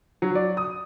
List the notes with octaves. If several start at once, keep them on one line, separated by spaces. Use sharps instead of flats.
F#3
D5
D#6